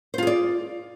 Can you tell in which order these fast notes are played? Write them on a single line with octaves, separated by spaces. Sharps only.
C5 F4 G#4 D5